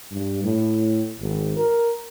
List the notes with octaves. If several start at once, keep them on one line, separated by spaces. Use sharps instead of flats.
G2
A2
G#1
A#4